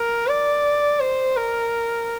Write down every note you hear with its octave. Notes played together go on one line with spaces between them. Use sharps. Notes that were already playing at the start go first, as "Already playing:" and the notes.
Already playing: A#4
D5
C5
A#4